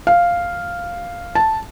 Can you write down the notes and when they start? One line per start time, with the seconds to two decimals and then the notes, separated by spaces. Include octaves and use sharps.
0.07 F5
1.35 A5